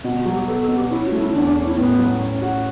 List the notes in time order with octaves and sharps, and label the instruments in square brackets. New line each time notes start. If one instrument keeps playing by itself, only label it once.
[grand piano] B2 [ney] F#4
[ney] F#4
[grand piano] F#3
[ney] G4
[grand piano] B3 [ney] A4
[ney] A4
[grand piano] B2
[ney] G4
[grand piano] C#4 [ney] E4
[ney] F#4
[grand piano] A3
[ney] E4
[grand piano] E2 [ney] D4
[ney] D4
[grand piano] C#4
[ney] E4
[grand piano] A2 [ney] B3
[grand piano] F#3
C#4
F#4